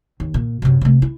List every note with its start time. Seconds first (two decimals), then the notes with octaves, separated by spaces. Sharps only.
0.20 D#2
0.34 A#2
0.62 F#2 C3
0.81 C3 A3
1.02 E4